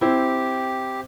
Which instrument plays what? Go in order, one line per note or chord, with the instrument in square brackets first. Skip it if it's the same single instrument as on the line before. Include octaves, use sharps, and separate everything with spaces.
[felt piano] C4 E4 [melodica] G4